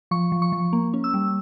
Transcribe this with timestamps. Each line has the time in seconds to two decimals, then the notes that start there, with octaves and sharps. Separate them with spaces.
0.11 F3 C#6
0.32 F3
0.42 C#6
0.52 F3
0.73 A#3
0.94 C#4
1.04 E6
1.14 G3